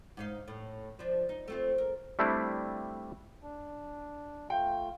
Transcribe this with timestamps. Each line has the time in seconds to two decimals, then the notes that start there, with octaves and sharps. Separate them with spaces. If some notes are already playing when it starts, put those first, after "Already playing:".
0.17 G#2 D#4 F5
0.48 A2
0.99 F3 D4
1.29 D#4
1.48 A3 C4 F4
1.78 A#4
2.19 G3 A3 C4 D4 E4
3.43 D4
4.50 A3 F4 G5